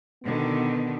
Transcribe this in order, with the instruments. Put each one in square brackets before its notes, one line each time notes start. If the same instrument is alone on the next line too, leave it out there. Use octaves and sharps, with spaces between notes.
[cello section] B2 D3 D#3 [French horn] B3